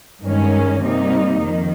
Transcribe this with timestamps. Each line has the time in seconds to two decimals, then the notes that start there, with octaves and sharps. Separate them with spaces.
0.23 G2 D#3 G#3 C#4
0.82 C3 G3 A#3 D#4
1.42 F2 D#3